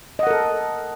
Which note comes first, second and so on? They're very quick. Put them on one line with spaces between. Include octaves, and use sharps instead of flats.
D#5 F#5 A#4 A4